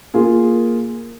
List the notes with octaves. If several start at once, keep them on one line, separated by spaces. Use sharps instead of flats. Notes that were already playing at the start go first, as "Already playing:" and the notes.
A#3 F4 G#4